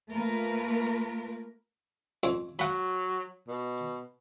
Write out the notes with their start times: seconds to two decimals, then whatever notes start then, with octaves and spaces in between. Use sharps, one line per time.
0.11 A3 A#3 F4 A#4 B4
2.23 F2
2.59 F#3 F#5 B5
3.48 B2